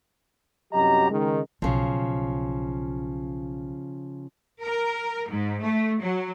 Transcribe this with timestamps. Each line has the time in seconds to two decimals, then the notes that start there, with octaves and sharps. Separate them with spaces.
0.72 C2 F#2 F#3 G4 D#5 A#5
1.10 C#2 D#3 G#3
1.62 B1 C#3 F3
4.60 A#4
5.29 G#2
5.61 A3
6.00 F#3